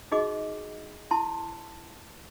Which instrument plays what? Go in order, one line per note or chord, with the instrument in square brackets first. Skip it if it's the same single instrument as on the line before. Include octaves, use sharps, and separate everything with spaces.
[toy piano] D#4 F#4 G#4 D#5 D6
E4 A5 C6